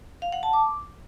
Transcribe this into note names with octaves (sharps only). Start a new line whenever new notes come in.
F5
F#5
A5
D6